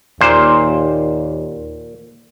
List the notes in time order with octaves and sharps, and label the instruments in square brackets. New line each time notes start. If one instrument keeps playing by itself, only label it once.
[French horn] D#2 [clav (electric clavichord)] A#2 C5